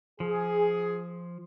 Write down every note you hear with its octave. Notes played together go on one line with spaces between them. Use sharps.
F3 G#4